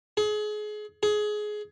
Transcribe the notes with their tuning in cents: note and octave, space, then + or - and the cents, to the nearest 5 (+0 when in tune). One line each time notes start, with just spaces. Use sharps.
G#4 +30
G#4 +20